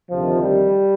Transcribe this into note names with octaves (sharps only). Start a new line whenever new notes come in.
D2 C3 D#3 F3
G3